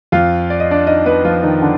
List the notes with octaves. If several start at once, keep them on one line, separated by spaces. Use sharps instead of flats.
F2 F3 F4 F5
D5
D#5
D4 D5
D#4 D#5
B3 B4
F3 F4
D#3 D#4
D3 D4